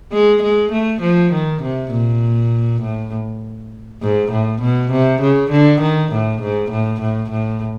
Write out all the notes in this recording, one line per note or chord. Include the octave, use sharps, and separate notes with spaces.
G#3
G#3
A3
F3
D#3
C3
A#2
A2
G#2
A2
B2
C3
C#3
D3
D#3
A2
G#2
A2
A2
A2